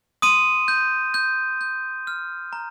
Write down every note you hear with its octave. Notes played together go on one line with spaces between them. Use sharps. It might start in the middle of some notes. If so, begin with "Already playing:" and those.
C6 D#6 D#7
G6
G6
G6
F6
A#5